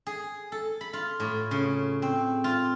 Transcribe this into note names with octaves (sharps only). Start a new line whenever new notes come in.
G#4
A4
B5
F4
A2
C#3
C4
F4